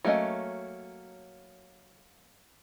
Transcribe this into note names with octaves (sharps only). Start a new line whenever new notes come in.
F#3 A3 A#3 C#4 D#5